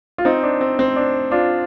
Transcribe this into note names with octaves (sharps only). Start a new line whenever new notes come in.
F4
C4 D#4
D4
C4
C4
D4
D4 F4